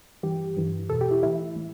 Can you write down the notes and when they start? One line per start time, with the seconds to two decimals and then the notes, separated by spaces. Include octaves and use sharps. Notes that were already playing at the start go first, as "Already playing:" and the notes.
0.23 G2 E3 G4
0.56 G2 E3
0.90 E2 B2 A4
1.01 G4
1.11 E4
1.23 A2 E3 E4
1.56 A2 E3